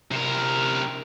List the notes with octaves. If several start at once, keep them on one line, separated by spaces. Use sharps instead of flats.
C3 A#4